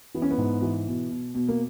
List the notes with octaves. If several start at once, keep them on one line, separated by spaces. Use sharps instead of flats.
E3 B3
C#4
B3
G#2
E3
B2
B2
B2
A#3